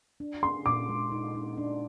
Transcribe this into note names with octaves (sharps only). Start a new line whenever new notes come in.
D4
G#4 C6
A#2 D6
G#3
D#4
D#4
D4